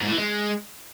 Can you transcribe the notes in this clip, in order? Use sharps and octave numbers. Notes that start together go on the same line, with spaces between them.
G#2
A2
E3
G#3